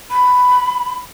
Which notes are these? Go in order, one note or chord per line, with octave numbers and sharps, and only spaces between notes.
B5